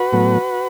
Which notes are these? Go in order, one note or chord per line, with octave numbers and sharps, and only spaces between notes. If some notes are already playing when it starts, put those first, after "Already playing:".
Already playing: F#4 B4
A2 F#3 B3